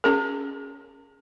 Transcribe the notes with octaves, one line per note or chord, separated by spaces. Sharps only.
C#4 G#4 A#4